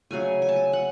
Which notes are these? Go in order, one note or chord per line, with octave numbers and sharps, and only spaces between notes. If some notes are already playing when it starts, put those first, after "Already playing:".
C#3 F#3 A3 G#5
G#5
A5
G#5
F#5